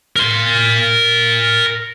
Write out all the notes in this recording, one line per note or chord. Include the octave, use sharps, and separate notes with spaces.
A#4 C6